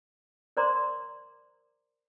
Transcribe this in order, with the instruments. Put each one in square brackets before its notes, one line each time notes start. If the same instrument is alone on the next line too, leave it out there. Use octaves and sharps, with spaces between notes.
[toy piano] A#4 C5 D5 A#5 C6 D6